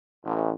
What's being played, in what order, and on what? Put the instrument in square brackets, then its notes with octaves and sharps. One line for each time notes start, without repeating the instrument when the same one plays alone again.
[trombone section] A1